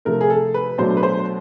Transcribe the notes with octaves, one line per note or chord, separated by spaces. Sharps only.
C3 F3 A3 A#4
G#4
A4
B4
B2 F#3 A3 D4 C5
B4
C5